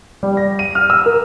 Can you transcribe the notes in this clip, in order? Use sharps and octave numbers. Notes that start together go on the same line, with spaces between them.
G3
A#6
D#7
F6
E6
A#4